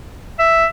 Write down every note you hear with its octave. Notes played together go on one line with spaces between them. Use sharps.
E5